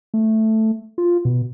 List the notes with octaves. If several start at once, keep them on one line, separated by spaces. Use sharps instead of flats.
A3
F4
B2